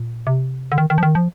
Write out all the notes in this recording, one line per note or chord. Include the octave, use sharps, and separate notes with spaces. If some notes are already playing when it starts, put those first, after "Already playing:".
Already playing: A#2
C3
D3
D#3
D#3
F3
D#3
F3